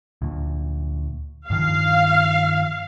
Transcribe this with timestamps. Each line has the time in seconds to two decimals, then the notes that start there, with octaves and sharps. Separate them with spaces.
0.22 D2 A#2
1.50 G2 D#3 F3 F5